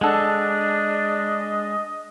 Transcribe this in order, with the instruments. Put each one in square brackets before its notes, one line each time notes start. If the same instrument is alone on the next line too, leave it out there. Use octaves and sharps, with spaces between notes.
[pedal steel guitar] G#3 [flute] D4 [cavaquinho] A4 F#5 [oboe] D#5